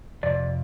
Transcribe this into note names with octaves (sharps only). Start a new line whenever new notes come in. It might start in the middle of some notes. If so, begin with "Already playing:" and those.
F2 C3 D5